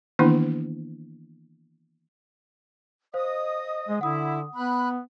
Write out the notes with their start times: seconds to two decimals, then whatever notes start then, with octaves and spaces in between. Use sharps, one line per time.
0.19 D#3 E3 A#3 B3 D4 E4
3.14 C5 D#5 F5 D#6
3.88 G#3
4.01 D3 E4 F#5 D#6
4.55 B3 B5 F#6